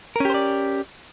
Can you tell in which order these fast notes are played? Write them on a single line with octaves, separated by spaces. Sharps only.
A#4 C#4 G4 C5 D5